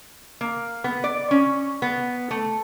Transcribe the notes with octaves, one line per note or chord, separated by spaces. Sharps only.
A#3
B3
D5
C#4
B3
A3